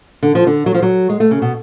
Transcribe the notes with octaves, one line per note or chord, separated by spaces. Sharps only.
D3
F3
D3
F#3
F3
F#3
G#3
A3
C#3
B2